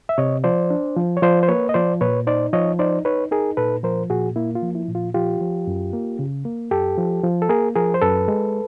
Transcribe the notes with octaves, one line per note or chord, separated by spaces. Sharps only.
E5
C3 C#5 D#5
F3 C5 D5
D4
F3
C#5
F3 C5 D5
C5
A#3 B4 C#5
D#5
F3 C5 D5
A#2 B4 C#5
D#4 C5 D5
F3 C#5 D#5
D#4 C5 D5
D#4 B4 C#5
D#4 G#4 A#4
A#2 A4 B4
F3 A#4 C5
A#2 F#4 G#4
A#3 E4
F4
F3
E4
A#2
F4
F3 F4 G4
F3
F#2
A#3
C#3
A#3
F#2 G4 A4
F3
F3
A4
A#3 G#4 A#4
F3 G#4 A#4
C5
F#2 A4 B4
G#3